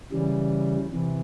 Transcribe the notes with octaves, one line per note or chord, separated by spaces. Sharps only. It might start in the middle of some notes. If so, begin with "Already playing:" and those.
C#3 E3 G3
C3 E3